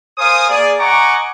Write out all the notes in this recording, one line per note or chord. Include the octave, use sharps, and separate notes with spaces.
A#4 C5 F5 G#5 D#6
A#3 G#4 D5
D#5 F#5 G#5 A#5 C#6 D6